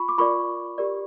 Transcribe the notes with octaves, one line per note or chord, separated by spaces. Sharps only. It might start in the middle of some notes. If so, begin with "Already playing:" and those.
Already playing: F4 B5 C#6
D6
F4 A#4 D5 B5 C#6
G4 A#4 D5